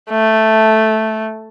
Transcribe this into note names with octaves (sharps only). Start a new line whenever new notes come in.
A3